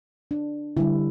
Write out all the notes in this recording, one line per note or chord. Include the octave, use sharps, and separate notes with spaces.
D4
D3 G3 E4